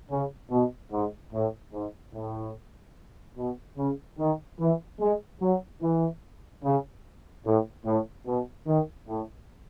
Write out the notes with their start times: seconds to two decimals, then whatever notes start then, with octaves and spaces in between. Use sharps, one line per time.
0.11 C#3
0.51 B2
0.92 G#2
1.34 A2
1.73 G#2
2.14 A2
3.37 B2
3.78 C#3
4.19 D#3
4.60 E3
5.00 G#3
5.42 F#3
5.82 E3
6.64 C#3
7.46 A2
7.85 A2
8.27 B2
8.67 D#3
9.08 A2